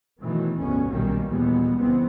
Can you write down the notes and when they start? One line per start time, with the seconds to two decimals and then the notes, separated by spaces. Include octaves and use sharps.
0.21 B2 D#3 E3 F#3 A3 B3
0.57 F1 D2 G#2 B2 B3 C#4
0.88 B1 A#2 D#3 G3 A#3 C#4
1.26 D#2 A#2 E3 G3 G#3 B3
1.76 C#2 C#3 E3 B3 C4